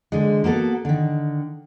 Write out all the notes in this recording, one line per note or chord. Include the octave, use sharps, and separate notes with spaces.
D3 G#3
A#3 B3 F#4 A4
D3 D#3